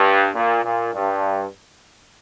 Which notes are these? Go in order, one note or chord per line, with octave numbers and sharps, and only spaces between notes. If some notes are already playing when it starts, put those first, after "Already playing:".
Already playing: G2
A#2
A#2
G2